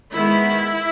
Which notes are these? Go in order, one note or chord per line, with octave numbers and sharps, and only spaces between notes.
D#3 G#3 B3 E4